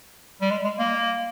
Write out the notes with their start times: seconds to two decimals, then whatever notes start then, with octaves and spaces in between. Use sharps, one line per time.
0.42 G3
0.51 G#3
0.64 G#3
0.79 A#3